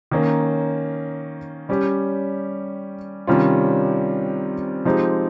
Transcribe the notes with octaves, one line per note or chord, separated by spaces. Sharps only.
D#3 A#3 C#4
G3 C#4 G4
C3 D#3 G3 C#4 F4
F3 G#3 C4 D#4 G4